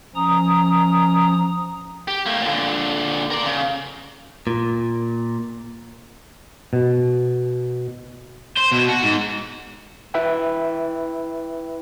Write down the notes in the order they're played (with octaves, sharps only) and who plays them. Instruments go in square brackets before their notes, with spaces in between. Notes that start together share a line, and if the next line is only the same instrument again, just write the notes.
[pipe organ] F3 C#4 A#5 D#6
[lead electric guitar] G4
A3 A#3
A#2 D3
A#4 D5
C#3
[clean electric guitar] A#2
[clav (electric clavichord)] B2
[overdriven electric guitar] C5
B2
F#4
G#2
[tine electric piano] E4 B4 E5 G5